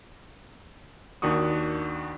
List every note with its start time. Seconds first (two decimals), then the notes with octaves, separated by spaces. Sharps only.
1.22 D#2 D#3 D4 F#4 C#6 D#6